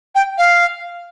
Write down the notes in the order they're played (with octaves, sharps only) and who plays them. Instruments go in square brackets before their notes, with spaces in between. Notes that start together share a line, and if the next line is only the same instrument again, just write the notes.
[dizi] G5
F5